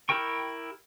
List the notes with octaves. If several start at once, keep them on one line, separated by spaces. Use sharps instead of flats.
E4 G4 A#4 G5 C#6